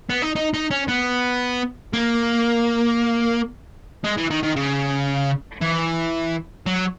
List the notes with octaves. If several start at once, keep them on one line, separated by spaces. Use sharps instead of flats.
B3
D#4
D#4
D#4
C#4
B3
A#3
G#3
E3
D#3
D#3
C#3
E3
F#3